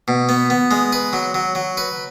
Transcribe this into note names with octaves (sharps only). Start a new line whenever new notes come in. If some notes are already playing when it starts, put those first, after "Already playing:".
B2
B3
B3
G#3
B4
F#3
F#3
F#3
B4